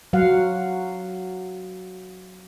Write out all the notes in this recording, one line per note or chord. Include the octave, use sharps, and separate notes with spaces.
F#3 F5 F#5